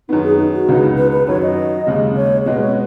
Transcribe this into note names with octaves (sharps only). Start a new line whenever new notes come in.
F#2 D#3 B3 D#4
G#4
D#4
F#4
C#2 C#3 B3 D#4
B4
B4
F#2 D#3 F#3 C#5
D#5
D#2 C#3 G#3
C#5
B2 G#3 B3 D#5
C#5